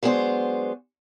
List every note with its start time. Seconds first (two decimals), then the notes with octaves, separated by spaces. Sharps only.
0.03 F#3 G#3 B3 C4 D4 C5